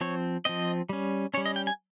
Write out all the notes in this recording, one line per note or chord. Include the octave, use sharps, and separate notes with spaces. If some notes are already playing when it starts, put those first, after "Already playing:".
F3 C4 C#5
F3 C4 D#5
G3 C#4
G3 C#4 C#5
D#5
G5
G#5